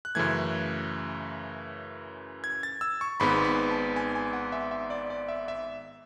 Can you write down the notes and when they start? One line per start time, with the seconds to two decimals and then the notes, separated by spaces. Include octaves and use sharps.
0.05 F#6
0.15 F#2 C#3 E3 A3 G#6
2.44 G#6
2.63 A6
2.81 E6
3.01 C#6
3.20 G#1 G#2 G#3 B3 B5
3.45 B5
3.71 A5
3.96 G#5
4.15 G#5
4.33 F#5
4.52 E5
4.71 E5
4.90 D5
5.10 D5
5.28 E5
5.48 E5